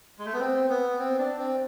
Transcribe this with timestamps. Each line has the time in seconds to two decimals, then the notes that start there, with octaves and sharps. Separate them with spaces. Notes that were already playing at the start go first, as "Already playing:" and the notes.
0.19 G#3
0.26 A3
0.33 B3
0.40 C4
0.70 B3
0.99 C4
1.18 D4
1.38 C4